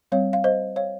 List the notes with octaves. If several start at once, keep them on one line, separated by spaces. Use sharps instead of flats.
G3 C4 C#5 F5
F5
C5 D#5
C#5 F5